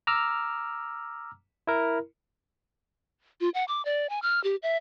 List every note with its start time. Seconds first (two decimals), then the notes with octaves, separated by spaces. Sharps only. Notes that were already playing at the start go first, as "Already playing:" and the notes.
0.07 A#5 D6 E6 F6
1.67 E4 A#4
3.41 F4
3.54 F#5
3.68 D6
3.85 D5
4.10 G#5
4.22 F6
4.44 G4
4.63 E5